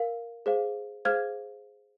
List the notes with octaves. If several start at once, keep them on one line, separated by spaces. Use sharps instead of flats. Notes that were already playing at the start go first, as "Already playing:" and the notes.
Already playing: A#4 F5
G#4 C5 F5
G#4 C5 F5 F6 G#6